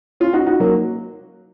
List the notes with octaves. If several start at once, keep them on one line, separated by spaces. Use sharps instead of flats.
C#4 F4
D#4 F#4
D#4 F#4
F#3 A#3